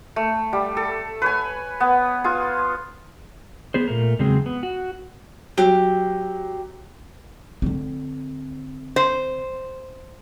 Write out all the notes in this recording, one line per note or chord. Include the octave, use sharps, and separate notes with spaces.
A3
G3
A4
B4 C#5 G#5
B3
F4 G#4
B3 G#4 C5
A#2 A3 A#4
E2 C#3 F#3 G#3 C4 G#4
B3
F#4
F#3 G4
D3 C4
C5